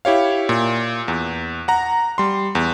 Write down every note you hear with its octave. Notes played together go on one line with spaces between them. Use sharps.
E4 G4 C#5 F5
A#2
E2
F#5 A#5
G3 C6
E2